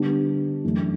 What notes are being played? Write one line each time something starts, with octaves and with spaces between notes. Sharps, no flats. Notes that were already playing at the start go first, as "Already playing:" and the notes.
Already playing: D3 G3 B3 D4 G4
F#2 E3 A3 D4